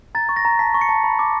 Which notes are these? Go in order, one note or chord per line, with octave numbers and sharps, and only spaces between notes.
A#5 A6
C#6
A#6
A#5
A5 B6
C#6
C#7
A5
B5
D6